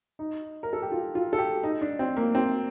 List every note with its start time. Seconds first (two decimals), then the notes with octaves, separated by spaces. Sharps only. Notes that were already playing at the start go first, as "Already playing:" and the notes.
0.19 D#4
0.63 A#4
0.73 A4
0.82 G4
0.92 F4
1.15 F4
1.33 A4
1.38 G4
1.63 D#4
1.81 D4
1.99 C4
2.17 A#3
2.35 C4